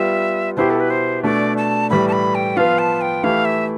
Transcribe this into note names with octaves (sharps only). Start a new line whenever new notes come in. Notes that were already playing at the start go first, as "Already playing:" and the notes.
Already playing: G3 B3 F4 E5
B2 B3 E4 G4 C5
A4
B4
C5
B2 A3 D4 D5
A5
A2 E3 G3 B5
A5
B5
G5
F3 B3 F4 F5
A5
G5
E3 A3 E4 G4 F5
E5